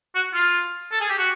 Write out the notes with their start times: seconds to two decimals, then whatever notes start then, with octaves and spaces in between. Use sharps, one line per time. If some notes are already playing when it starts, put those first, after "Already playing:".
0.15 F#4
0.33 F4
0.92 A4
1.01 G#4
1.09 G4
1.18 F#4